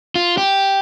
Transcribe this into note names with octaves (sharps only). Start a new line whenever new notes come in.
F4
G4